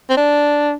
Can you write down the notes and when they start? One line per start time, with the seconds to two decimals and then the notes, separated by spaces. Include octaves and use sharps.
0.10 C4
0.17 D4